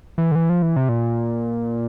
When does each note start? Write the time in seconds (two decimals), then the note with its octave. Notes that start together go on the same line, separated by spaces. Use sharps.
0.18 E3
0.32 D3
0.35 E3
0.50 F3
0.62 E3
0.76 C3
0.89 A#2